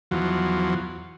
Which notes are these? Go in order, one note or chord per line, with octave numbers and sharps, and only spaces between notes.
E2 F3 F#3